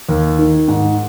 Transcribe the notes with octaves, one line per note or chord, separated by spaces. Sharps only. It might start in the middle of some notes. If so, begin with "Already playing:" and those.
D#2
D#3
G#2